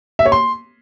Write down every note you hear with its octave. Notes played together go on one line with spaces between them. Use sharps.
E5
C#5
C6